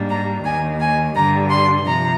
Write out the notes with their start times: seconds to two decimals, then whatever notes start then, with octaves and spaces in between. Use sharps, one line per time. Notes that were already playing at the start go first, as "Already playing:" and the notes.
Already playing: G#2 G3 A#3 D4
0.10 A#5
0.44 D#2 D#3 A#3 G#5
0.80 G#5
1.15 G2 D3 G3 A#5
1.50 C6
1.86 C3 F3 A#5